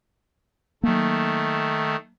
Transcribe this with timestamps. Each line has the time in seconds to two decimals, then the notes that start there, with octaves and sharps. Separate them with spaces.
0.83 D#3 F#3 A3 A#3